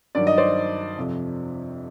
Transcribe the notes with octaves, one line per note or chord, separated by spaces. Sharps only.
G2 D#3 F#3 D5
D#5
C5 D5
F2 C3 F3